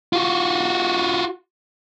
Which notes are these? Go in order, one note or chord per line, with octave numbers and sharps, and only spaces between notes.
F4 F#4